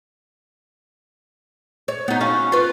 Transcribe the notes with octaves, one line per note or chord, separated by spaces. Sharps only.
C#5
B3 D#4
C#4 F#4 F5
F4 B4